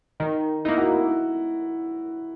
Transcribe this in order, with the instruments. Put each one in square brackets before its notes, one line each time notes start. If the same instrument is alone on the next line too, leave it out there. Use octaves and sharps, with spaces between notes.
[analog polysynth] D#3 [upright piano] D#4
[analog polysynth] A#3 D#4 [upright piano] E4
[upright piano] F#4
E4